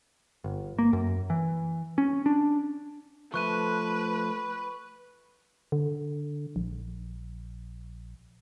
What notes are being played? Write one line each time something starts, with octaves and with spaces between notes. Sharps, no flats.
G1
A#3
F#2
E3
C#4
D4
F3 A3 B4 C#6 F#6 D#7
D3
A#1